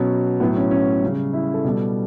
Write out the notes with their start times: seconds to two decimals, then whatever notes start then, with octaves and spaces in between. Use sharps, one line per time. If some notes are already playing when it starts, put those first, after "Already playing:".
Already playing: B2 F#3 C#4
0.40 A2 F#3 B3
0.56 C#4
0.71 C#4
1.02 C#3 G3
1.33 E4
1.54 A4
1.64 B2 G3